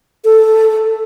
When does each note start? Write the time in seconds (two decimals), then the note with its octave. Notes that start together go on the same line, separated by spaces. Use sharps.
0.25 A4